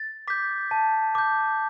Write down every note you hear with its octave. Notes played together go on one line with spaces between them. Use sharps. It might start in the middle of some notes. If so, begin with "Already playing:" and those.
Already playing: A6
D6 G6 B6
A5
D6 G6